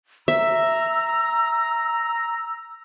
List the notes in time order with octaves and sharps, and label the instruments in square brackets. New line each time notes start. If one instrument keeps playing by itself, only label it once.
[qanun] E5 [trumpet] A#5 [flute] E6